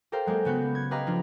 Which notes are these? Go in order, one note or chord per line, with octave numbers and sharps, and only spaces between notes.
G4 A4 A#4 C5 F5 G5
F#3 G#3 A#3 G4
C#3 B3 F#4 G6
G#6
G4 B4 D#5 F5 A#5 D6
F3 D4 F4